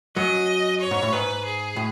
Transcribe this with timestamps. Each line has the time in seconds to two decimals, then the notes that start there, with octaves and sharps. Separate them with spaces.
0.16 F#2 F#3 D#5
0.81 C#5
0.91 G#2
1.02 A2
1.12 G#2 B4
1.45 G#4
1.76 A2